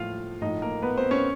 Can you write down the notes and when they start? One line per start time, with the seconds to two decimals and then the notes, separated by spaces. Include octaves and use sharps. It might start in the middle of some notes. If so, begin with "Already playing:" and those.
Already playing: A2 F3 F4 F5
0.41 A2 F3 D#4 D#5
0.62 A#3 A#4
0.82 B3 B4
0.97 C4 C5
1.11 C#4 C#5